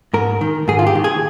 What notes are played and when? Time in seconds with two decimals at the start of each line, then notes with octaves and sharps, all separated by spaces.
0.13 G#2 A#4
0.41 D#3
0.68 G#2 G#4
0.79 F4
0.87 G4
0.95 D#3
1.04 G#4